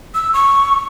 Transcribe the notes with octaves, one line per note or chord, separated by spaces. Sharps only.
E6
C#6